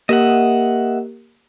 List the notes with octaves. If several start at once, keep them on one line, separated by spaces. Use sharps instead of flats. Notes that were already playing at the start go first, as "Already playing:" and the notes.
A#3 G4 A#4 D#5 E5 F#5